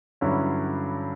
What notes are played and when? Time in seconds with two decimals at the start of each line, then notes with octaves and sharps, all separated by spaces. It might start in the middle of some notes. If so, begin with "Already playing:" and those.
0.21 G2 D3 F#3 C#4 E4